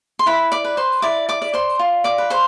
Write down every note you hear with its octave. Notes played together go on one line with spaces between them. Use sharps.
C6
E4 B4 B5
D5 D6
B4
C5 C6
E4 D5 D6
D5 D6
D5
C5 C6
F4
D5 D6
B4
C5 C6